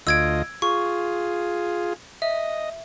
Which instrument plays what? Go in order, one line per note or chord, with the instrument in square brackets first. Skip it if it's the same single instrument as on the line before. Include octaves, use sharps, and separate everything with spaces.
[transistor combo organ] D2 F4 D#5 [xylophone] E6 G#6 D7
[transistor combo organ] F4 G#4 [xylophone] C#6
[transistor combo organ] D#5 [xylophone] E5